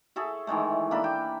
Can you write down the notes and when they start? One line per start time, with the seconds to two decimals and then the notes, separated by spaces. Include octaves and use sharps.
0.16 G#4 A4 C#5 E5
0.47 D#3 E3 G#3 A3
0.91 A#3 D4 A4 B5
1.04 G5